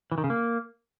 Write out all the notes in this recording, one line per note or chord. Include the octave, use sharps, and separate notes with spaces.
E3
D#3
C#3
A#3